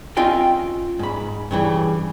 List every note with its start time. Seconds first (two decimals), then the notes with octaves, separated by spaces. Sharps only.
0.17 C4 C#4 F4 D#5 F5 G5
0.99 G#2 B5
1.51 G2 C#3 E3